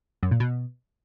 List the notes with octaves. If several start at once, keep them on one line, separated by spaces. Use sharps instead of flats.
F#2
A#2
B2